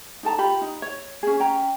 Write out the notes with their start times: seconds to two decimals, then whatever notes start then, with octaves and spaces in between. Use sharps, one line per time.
0.23 D#4 A4 A5 A#5
0.38 F4 G4 B5
0.61 D#4
0.82 C#5
1.23 C#4 G#4
1.40 C#4 G5 A#5